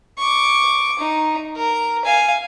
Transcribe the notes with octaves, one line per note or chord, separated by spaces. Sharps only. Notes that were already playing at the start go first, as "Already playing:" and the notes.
C#6 D6
D#4
A#4
F5 G#5